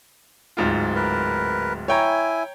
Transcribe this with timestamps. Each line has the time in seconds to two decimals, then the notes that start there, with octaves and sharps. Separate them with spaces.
0.57 D1 G#2 F4
0.95 A#4 B4
1.88 E4 C#5 G5 G#5 A#5